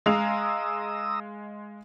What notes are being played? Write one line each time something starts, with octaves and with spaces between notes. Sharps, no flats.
G#3 F5 A#5 D#6 E6 F7